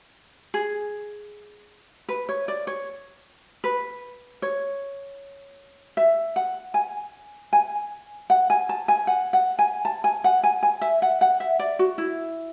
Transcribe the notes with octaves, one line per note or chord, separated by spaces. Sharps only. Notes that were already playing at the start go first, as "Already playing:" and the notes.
G#4
B4
C#5
D5
C#5
B4
C#5
E5
F#5
G#5
G#5
F#5
G#5
A5
G#5
F#5
F#5
G#5
A5
G#5
F#5
G#5
G#5
E5
F#5
F#5
E5
D5
F#4
E4